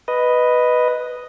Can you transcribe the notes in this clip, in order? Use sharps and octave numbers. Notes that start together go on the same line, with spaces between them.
B4 D#5